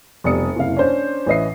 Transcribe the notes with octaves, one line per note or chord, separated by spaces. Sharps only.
F1 B2 G3 D5 D#6 C#7
F#1 C3 E4 F5
C#4 D4 C5
A1 C#4 B4 D#5 E5 C7